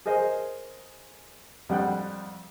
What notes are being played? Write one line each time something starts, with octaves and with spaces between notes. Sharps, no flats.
G#4 A#4 C5 D#5 G#5
F2 G3 F#5 G5 F#6